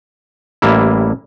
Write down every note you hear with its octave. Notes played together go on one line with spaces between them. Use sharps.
A1 G3 A#3 E4